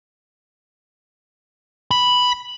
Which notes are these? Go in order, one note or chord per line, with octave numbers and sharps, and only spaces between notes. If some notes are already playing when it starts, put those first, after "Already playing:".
B5